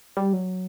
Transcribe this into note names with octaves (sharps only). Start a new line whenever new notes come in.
G3
F#3